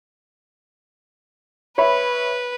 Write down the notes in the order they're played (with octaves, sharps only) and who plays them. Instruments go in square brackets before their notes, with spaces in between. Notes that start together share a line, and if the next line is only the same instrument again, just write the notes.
[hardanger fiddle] B4 [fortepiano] C#5 E5 B5